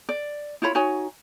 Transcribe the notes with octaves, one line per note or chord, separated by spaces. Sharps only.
D5
E4 F4 C#5 B5
D#4 F#4 C#5 G#5